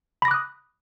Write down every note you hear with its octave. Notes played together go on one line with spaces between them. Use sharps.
B5 D6 D#6 F#6 A#6